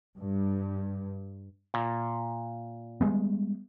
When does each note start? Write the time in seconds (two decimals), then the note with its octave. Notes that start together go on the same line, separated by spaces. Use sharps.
0.18 G2
1.74 A#2
3.01 G3 G#3 B3